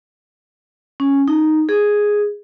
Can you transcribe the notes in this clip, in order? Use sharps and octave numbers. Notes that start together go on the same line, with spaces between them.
C#4
D#4
G#4